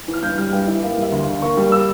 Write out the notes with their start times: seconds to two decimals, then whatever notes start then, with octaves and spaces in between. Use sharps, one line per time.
0.08 E3
0.14 F6
0.23 G2 G6
0.38 G3 F6
0.53 G2 G5
0.67 E3 E5
0.82 A#3 F5
0.97 G3 E5
1.12 D2
1.22 D3 F5
1.42 A#3 C#6
1.57 G3
1.72 E6